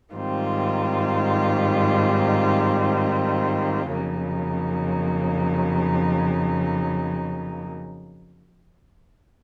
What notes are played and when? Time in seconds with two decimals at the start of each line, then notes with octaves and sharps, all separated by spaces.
0.13 G#2 D#3 G3 C4 F4
3.91 F2 C#3 F#3 A#3 D#4